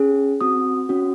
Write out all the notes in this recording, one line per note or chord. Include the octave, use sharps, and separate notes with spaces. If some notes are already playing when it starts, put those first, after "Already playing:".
Already playing: C#4 G#4
C4 F#4 D#6
C#4 F#4